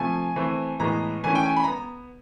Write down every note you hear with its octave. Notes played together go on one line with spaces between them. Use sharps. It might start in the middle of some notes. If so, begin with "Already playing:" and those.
Already playing: C3 F3 A3 G#5
E3 A3 C4
A2 E3 G#3 B3 A#5
E3 A3 C#4 G#5
G5
G#5
B5
A#5
B3